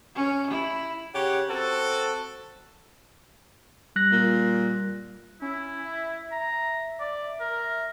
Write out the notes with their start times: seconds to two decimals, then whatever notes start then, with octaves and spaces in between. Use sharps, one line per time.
0.15 C#4
0.51 E4
1.15 C#3 G4 C#5 F#5
1.49 C4 F#4 A4
3.96 G3 F#6 A#6
4.12 A#2
5.42 C#4 E4
5.84 E5
6.31 A#5
7.00 D5
7.40 A#4